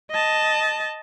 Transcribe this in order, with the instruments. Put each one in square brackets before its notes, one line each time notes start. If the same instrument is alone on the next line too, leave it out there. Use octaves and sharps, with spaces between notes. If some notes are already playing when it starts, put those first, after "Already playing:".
[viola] D#5 A5